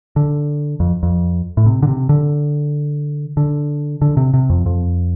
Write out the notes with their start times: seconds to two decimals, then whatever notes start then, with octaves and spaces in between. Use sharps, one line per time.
0.16 D3
0.80 F2
1.03 F2
1.57 A2
1.66 C3
1.83 D3
1.87 C3
2.09 D3
3.37 D3
4.02 D3
4.17 C3
4.34 C3
4.50 F2
4.66 F2